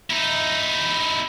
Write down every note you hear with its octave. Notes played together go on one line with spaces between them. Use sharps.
D#4 E4